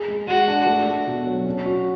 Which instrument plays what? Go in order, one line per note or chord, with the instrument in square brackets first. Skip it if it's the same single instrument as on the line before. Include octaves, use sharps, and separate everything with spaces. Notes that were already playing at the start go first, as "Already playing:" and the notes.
Already playing: [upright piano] G#4
G#3
[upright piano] G#3 [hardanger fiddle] F#4
[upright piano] D4
A3
D4
B2
F#3
C#4
F#4